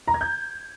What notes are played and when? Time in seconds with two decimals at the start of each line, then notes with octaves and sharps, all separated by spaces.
0.08 A#5
0.14 G#6
0.21 G6